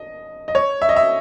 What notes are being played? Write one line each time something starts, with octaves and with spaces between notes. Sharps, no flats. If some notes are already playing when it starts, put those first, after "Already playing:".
Already playing: D#5
D#5
C#5
E5
D#5
E5